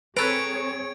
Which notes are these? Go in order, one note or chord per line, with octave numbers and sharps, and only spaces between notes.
C4 G#4 A4 B4 C#5 A#5 G#6 D7